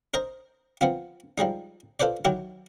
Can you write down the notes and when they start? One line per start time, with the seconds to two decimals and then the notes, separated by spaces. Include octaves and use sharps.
0.14 A#4 C5 D#5 A#5
0.81 F3 B3 C4 F4
1.38 F3 G3 G#3 D#4
2.00 F4 A4 B4 C5 D5
2.25 D#3 F#3 E4 G4